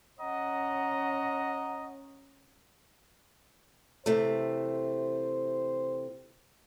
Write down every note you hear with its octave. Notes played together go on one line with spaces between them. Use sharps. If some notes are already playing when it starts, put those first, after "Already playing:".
C#4 D#5 F#5 A#5
C3 E3 A3 C5